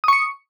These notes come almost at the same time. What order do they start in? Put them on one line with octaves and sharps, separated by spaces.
D#6 C#6 C#7